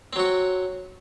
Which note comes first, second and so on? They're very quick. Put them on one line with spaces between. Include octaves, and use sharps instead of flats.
C4 F#3 F#4